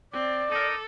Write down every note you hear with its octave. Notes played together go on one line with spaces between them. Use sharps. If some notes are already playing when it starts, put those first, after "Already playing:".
C4 D5 D6
D#4 A4 A#4